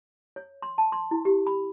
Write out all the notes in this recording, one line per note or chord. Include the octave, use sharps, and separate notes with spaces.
C#5
C6
A5
C6
E4
G4
B5